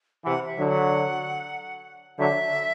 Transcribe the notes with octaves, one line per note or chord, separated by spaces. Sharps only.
C3 E3 F#5
E5
D3 F#3
F#5
D3 F#3 E5